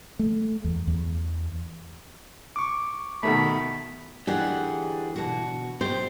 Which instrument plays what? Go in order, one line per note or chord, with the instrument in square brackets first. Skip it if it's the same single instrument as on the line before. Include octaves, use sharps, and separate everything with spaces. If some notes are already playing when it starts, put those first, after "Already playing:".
[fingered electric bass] A3
E2
E2
[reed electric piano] C#6 D6
[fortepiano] B2 D#3 A3 [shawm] B5
[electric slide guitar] D3 E3 D4 [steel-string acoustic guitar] G4 G#4 F#5
[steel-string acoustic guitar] B2 F#4
[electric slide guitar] B2 G4 [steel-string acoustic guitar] C5